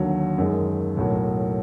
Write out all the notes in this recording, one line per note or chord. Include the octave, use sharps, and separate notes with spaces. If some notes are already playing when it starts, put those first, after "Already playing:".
Already playing: D#2 D3 F#3
F#2 D#3 G#3
B1 A2 F#3 A#3